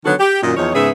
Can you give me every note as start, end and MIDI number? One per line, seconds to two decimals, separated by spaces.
0.05 0.14 50
0.05 0.14 51
0.05 0.14 54
0.05 0.14 59
0.05 0.14 66
0.05 0.14 69
0.19 0.42 67
0.43 0.55 42
0.43 0.55 46
0.43 0.55 51
0.43 0.55 75
0.57 0.70 40
0.57 0.70 53
0.57 0.70 63
0.57 0.70 73
0.75 0.89 44
0.75 0.89 49
0.75 0.89 59
0.75 0.89 68
0.75 0.89 76